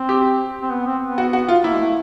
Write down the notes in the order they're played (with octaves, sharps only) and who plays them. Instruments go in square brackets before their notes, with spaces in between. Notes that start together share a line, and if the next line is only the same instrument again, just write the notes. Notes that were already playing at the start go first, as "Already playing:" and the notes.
Already playing: [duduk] C4
[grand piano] G4
[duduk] C4
B3
C4
B3
[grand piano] F#4
F#4
F4
[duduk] A#3 [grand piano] E4
[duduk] G#3
A3